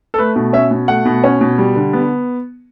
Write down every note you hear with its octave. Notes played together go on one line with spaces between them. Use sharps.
A4
A3 B4
B2
C#4 E5
B2
A3 F#5
B2
C#4
B2
G3
D3
B3